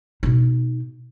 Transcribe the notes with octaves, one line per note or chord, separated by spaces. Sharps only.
B2 D#4